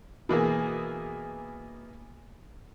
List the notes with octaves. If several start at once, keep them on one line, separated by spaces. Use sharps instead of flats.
B2 E3 A#3 G#4